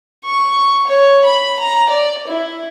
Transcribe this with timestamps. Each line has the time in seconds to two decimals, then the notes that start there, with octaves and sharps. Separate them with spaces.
0.24 C#6
0.87 C#5
1.24 B5
1.59 A#5
1.89 D5
2.27 E4